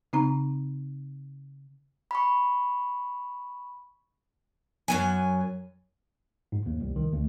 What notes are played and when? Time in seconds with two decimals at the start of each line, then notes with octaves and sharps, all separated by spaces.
0.13 C#3 C4 D#4 A#5
2.11 B5 C#6
4.88 F#2 F#3 G#5
6.52 G#2
6.66 D#2
6.81 C2
6.96 D#3
7.13 D2